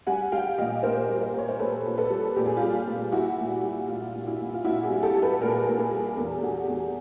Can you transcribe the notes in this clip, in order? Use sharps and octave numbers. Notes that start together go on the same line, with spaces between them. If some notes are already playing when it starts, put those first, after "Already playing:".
G3 F#5 G#5
G3 F5 G5
A#2 D#5 F5
A#2 A#4 C5
G3
A#4 C5
A#2 C#5
C5
A#2 A4 B4
A#2
A4 B4
G3
A#2 G4
G#4
G3 F4 G4
A#2
G3 E4 F#4
A#2
G3
A#2 F4
A#2
E4 F#4
A#2
F4
A#2 E4 F#4
F#4 G#4
G3
G4 A4
G3
A4 B4
A#2 G#4 A#4
A#2
G#4 A#4
G3
E2 G4 A4
E2 F#4 G#4
G4
E2 F#4 G#4